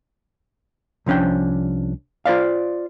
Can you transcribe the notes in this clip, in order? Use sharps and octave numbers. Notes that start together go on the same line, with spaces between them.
C2 F3 C#4 D4 G5
F4 C5 D5 F5